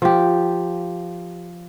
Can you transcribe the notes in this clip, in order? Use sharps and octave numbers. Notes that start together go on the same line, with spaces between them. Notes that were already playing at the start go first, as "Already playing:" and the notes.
F3 G4